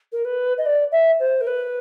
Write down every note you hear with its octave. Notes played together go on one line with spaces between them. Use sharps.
A#4
B4
D#5
D5
E5
C5
A#4
B4